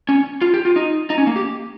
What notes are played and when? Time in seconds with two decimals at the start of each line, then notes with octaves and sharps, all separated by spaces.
0.09 C#4
0.42 F4
0.54 G4
0.65 F4
0.76 D#4
1.10 D#4
1.18 C#4
1.27 A#3
1.36 G4